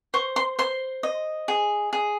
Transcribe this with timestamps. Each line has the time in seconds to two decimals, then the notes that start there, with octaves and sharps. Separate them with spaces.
0.14 C5 C#6
0.36 C6
0.59 C5 C6
1.03 D#5
1.48 G#4
1.93 G#4